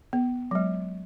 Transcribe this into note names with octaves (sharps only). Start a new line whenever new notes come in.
B3
F#3
G#3